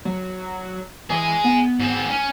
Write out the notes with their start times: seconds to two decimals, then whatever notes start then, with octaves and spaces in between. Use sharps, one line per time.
0.05 F#3
1.10 E3 G#4 D#5
1.44 B3
1.80 G#2 C4
2.09 C#4